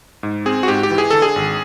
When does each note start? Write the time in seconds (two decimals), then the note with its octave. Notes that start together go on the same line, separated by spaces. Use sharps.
0.23 G#2
0.46 C4 G#4
0.63 F#4
0.68 G#2 G4
0.83 G4
0.91 E3
0.98 G#4
1.10 D3 A4
1.22 G#4
1.36 G#1